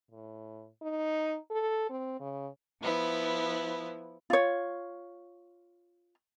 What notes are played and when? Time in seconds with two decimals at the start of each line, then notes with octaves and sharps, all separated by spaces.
0.11 A2
0.82 D#4
1.51 A4
1.90 C4
2.20 C#3
2.81 F3 B3 E4
4.30 F4 C#5